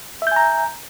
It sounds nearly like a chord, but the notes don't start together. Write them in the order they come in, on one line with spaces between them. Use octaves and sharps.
E5 G6 G#5 A#5